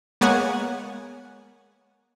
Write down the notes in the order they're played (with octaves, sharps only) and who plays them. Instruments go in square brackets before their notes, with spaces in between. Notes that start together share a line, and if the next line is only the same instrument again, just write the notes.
[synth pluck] G#3 A#3 B3 C#5 F#5 G#5